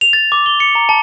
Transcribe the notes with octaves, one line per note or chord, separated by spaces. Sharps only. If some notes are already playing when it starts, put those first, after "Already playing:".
F7
A6
D6
G7
C#7
A#5
A5